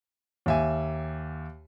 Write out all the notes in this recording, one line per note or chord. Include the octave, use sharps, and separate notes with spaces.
D#2 E5 G#5